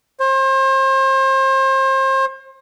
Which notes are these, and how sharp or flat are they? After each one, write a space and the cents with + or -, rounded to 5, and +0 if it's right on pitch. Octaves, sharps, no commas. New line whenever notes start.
C5 +35